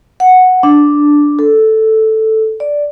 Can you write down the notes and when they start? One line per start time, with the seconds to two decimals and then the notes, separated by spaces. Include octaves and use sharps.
0.20 F#5
0.63 D4
1.39 A4
2.60 D5